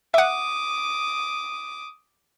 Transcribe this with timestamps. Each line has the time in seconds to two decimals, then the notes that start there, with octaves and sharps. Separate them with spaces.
0.14 E5 F#5 D6 D#6